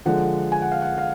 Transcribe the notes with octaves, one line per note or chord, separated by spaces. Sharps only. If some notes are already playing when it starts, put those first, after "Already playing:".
D3 F3 G#3 F#5
G#5
F#5
F5
F#5
F5